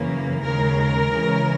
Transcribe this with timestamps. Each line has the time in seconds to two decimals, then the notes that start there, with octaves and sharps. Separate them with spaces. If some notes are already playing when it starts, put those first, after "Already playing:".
Already playing: F#2 C#3 E3 A#3
0.43 D#2 C#3 G#3 A#4
1.11 C#3 E3 G#3 C#4